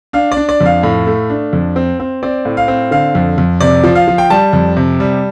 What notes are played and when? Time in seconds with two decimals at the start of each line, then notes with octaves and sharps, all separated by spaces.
0.13 D4 F5
0.32 D5
0.37 D4
0.49 D5
0.61 F2
0.66 F5
0.83 A2
1.07 A3
1.30 D4
1.53 F2
1.76 C4
2.00 C4
2.23 C4 D5
2.45 A2
2.57 F5
2.68 C4
2.91 D3 F5
3.15 F2
3.38 F2
3.61 C3 D5
3.84 F3
3.95 F5
4.08 F3
4.18 G5
4.30 G3 A5
4.53 F2
4.77 C3
5.00 G3